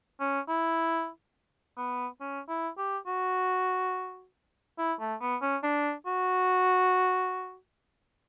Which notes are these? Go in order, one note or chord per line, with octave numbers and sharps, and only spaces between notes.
C#4
E4
B3
C#4
E4
G4
F#4
E4
A3
B3
C#4
D4
F#4